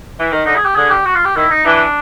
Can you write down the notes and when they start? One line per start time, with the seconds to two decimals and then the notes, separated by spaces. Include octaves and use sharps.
0.18 E3
0.32 D#3
0.46 D3 D#4
0.56 G#4
0.65 G4
0.75 D3 G#4
0.91 G4
1.05 F#4
1.15 F4
1.25 G4
1.36 D#3 E4
1.51 D#4
1.65 E3 D4